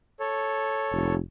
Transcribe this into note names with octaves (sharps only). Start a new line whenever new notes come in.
A4 C#5
F1